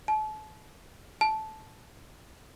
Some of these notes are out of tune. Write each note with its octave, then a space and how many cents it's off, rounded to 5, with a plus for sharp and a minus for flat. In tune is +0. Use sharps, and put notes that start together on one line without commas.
A5 -35
A5 -10